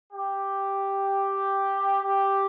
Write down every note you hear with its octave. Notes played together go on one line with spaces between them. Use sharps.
G4
G4